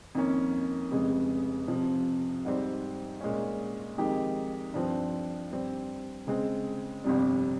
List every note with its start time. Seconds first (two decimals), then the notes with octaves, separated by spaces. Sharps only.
0.15 F2 D#3 A#3 C#4
0.91 F1 F2 C#3 G#3
1.68 F2 C3 F3
2.45 G#2 G3 C4
3.21 A#2 G#3 C#4
3.98 F2 D#3 G#3 D#4 G4
4.74 G2 F3 C4
5.51 G2 G3 C4
6.27 C#3 G#3 C4
7.04 G1 F2 C3 G3